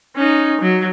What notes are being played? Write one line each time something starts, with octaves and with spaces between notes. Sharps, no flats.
C#4 D#4
F#3